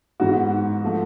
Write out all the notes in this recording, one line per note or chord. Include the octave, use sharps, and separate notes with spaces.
G#2 E3 G#3 B3 F#4
F3 A3